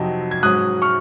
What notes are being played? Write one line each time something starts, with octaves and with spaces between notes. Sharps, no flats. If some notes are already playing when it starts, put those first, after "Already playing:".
Already playing: F2 C3 F#3 C4 D#4
G#6
G#2 F#3 C#4 D#6 F#6
C#6 F6